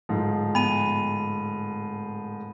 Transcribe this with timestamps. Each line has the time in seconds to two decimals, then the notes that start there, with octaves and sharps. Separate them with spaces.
0.09 D1 G#2 F3
0.55 B3 B5 D#7